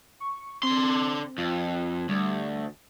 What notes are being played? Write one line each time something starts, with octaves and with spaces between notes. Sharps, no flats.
C#6
D3 C4 C6
F2 F4
D2 G3